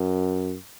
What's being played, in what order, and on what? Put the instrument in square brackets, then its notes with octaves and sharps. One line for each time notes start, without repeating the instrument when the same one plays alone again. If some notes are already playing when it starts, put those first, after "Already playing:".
Already playing: [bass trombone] F#2